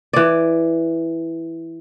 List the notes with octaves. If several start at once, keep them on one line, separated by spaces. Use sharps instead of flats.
E3 D5